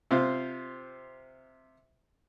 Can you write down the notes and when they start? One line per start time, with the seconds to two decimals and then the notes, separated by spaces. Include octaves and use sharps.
0.11 C3 F4 C5